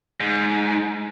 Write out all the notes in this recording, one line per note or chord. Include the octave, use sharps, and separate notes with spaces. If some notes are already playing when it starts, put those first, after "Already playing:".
G#2